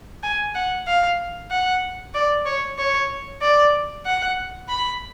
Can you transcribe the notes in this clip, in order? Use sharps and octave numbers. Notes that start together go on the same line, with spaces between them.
G#5
F#5
F5
F#5
D5
C#5
C#5
D5
F#5
B5